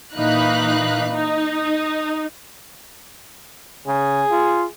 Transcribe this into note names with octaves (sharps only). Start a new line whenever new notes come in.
A#2 E3 D#4 F5 B5 F#6
D#4
C#3 G#4
F4